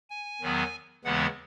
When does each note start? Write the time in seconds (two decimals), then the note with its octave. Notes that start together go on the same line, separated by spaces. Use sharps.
0.10 G#5
0.41 E2 D#3 F#3 B3
1.04 D#2 C#3 E3 G#3 B3 F#5